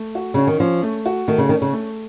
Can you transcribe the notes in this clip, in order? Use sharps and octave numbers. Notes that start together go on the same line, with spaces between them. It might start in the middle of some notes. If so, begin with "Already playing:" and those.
Already playing: A3
F#4
C#3 C#4
D#3
F3 C#4
A3
F#4
D#3 A3
C#3
D#3 C#4
C#3
A3